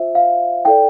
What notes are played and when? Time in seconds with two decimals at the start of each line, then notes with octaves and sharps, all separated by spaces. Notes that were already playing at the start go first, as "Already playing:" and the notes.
Already playing: F4 C5 E5
0.15 F5
0.65 E4 A4 D5 G5